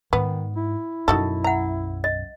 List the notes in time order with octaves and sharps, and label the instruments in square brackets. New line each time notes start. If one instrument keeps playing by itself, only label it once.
[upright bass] G#2 [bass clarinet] D#3 [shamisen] B3
[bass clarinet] E4
[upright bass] B1 F#2 [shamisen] D#4 F#4 A4 [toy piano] D#5
[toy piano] E5 F#5 [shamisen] A#5
[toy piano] D#5